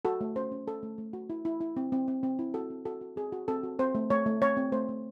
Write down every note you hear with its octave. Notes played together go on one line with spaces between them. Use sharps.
F#4 A4
A3
C#4 C5
C#4
C#4 A4
A3
A3
F#4
E4
E4
E4
C4
C4
C4
C4
E4
F#4 A4
C4
F#4 A4
F#4
C4 G#4
F#4
C4 A4
F#4
C4 C5
A3
A3 C#5
A3
C4 C#5
C4
A3 C5
A3